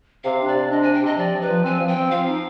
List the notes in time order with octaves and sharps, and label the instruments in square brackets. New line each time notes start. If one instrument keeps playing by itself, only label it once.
[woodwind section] C3 [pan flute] F5
[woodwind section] D4
[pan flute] D5
[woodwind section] C3
[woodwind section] D4 [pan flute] D#5
[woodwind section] C3 [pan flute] G#5
[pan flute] G5
[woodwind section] C3 [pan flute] D#5
[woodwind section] F3 [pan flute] D5
[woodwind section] F3
[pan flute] B4
[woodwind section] F3
[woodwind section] C4 [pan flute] G#5
[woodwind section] F3
[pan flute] G5
[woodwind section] C4
[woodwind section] F3 [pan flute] F5
[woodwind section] D#4